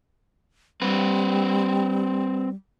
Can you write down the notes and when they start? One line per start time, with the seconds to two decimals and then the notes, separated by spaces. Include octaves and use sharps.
0.82 G3 C4 B4